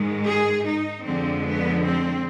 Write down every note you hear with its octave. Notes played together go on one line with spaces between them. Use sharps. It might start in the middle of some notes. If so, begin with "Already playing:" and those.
Already playing: G#2 D#3 G#3
G#4
D#4
F2 D3 F3 G#3 C4
B3
C4